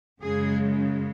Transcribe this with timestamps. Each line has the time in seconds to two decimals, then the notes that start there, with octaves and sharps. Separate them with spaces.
0.21 F#2 C#3 G#3 G#4